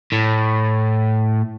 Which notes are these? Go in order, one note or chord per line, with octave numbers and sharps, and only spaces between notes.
A2